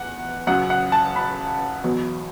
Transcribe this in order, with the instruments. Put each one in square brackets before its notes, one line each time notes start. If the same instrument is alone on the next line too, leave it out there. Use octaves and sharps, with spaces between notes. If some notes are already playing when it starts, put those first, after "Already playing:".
Already playing: [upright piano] E2 F#5
F#2 C#3 F#3 F#5
F#5
A5
B5
E2 B2 F#3